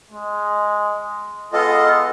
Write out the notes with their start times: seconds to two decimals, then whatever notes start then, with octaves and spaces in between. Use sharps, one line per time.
0.10 G#3
1.53 G#3 B3 F4 A4 D#5